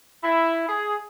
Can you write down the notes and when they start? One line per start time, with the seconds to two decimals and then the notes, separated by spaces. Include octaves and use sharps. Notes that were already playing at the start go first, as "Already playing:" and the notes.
0.24 E4
0.68 G#4